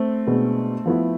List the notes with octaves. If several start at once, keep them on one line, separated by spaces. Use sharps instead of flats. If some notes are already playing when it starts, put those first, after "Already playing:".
Already playing: A3 C4
B2 G#3 B3 D4
F3 B3 E4